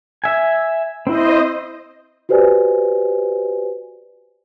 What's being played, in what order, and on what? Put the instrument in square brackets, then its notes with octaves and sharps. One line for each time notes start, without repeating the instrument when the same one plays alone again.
[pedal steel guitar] E5 G#5
[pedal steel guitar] C4 E4 [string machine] C5 D#5
[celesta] F#4 G4 B4 C5 D5 G#5